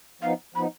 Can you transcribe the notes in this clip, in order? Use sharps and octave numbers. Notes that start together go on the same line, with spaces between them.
F3 B3 D#4 F5
F3 B3 D#4 B5